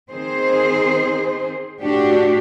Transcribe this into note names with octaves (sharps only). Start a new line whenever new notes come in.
D#3 C4 G#4 C5
A2 D4 F#4 G4